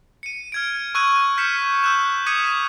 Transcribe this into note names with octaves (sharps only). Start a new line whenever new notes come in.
C#7 D#7
F6 G#6 D7
C#6 E6 F#6 G#6 D#7
F6 G6 B6 C#7 E7
E6 F#6 G6 E7
D6 D#6 G#6 B6 C#7 D#7